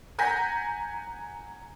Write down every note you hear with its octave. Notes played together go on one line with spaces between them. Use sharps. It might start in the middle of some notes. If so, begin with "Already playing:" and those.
F#5 G#5 A#5 G6 A#6 B6